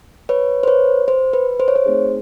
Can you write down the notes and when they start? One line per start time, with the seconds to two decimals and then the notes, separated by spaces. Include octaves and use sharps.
0.29 B4 C#5
0.63 C5
0.67 B4 C#5
1.08 C5
1.33 B4
1.60 C5
1.68 C#5
1.76 C5
1.86 A3 C4 D#4 G#4